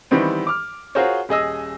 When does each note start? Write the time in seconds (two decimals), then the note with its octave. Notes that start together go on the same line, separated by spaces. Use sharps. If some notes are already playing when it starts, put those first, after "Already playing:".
0.11 D#3 E3 G3 B3 C4
0.47 D6 F6
0.95 F4 F#4 G#4 A#4 C5 C#5
1.29 D#1 G#4 D#5 E6